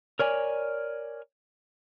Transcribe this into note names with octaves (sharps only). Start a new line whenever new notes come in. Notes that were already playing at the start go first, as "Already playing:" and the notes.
A#4 C#5 D5 G#5